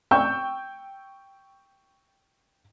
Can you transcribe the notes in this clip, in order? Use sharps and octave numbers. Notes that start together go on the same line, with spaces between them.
G5 C#6 E6 G6